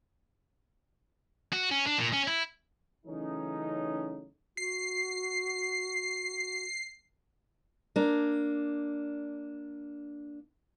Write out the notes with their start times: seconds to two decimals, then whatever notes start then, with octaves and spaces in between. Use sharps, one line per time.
1.53 F#4
1.71 C#4
1.87 D4
1.98 A#2
2.13 C#4
2.27 E4
3.06 C#3 E3 F#3 A3 C#4 D#4
4.57 F#4 C7
7.96 A#3 D4